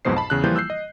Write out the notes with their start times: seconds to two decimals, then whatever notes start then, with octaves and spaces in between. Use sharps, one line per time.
0.05 B1 F2 G#2 B2 C5 C7
0.17 A5 B5
0.30 E2 C#3 F#6
0.44 E3 F3 G3 A#3 F4 G6
0.56 E6 F#6 G6 C7
0.70 D#5